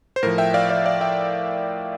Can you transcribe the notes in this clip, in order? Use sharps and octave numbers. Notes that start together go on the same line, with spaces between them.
C5
A2 F3 A#4
E5 G5
D5 F5
D5 F5
D5 F5
E5 G5